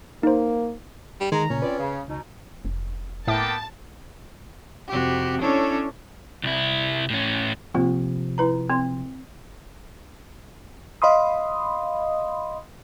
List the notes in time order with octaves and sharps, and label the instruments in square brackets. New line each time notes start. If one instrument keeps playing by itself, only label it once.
[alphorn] A#3 [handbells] D#4 C5
[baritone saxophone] G3
[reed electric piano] D#3 [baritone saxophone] G#3 [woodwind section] A#5
[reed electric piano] A#2 C#3 [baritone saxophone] C#4
[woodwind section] C4 F4 D5 [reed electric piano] B4
[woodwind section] C#3
[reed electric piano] C#2 [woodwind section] B2 D#4
[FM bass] F1
[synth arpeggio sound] A2 E5 D6 [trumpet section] A#3 B3 G5 [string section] A5
[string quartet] F2 C3 F#4 G4
C#4 D4 E4 A4 C#5
[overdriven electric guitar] C2 E4
A2 C#4
[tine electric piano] C3 F3 [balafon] A#3 C4 F4
[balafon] E4 B4 A#5
C4 C6
[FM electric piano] D#5 F5 B5 C6 D#6